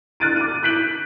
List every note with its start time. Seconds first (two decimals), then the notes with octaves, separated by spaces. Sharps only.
0.20 F6 F#6 A6 D7 D#7
0.36 D6 D#7
0.63 F#6 G6 B6 D7 F#7